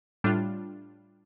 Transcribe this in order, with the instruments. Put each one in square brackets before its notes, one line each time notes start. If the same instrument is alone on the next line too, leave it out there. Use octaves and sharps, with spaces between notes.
[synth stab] A2 G3 D4 F4